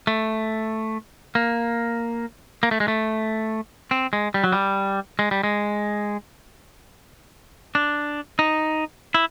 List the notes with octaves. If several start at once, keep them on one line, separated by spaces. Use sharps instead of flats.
A3
A#3
A#3
A3
G#3
A3
C4
G#3
G3
F#3
G3
G#3
G3
G#3
D4
D#4
E4